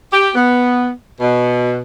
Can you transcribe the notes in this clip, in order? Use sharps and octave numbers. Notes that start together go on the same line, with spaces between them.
G4
B3
B2